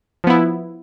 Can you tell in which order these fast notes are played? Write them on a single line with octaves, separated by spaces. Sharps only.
F3 B3 E4